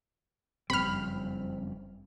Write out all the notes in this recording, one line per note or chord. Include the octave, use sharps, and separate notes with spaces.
F#1 F2 G3 C4 B5 F6